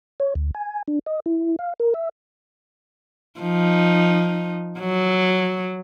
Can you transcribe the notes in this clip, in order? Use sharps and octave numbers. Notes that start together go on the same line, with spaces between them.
C#5
D2
G#5
D4
D#5
E4
F5
A#4
E5
F3 D#4
F#3